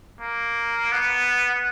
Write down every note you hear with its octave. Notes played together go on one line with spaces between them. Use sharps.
A#3
B3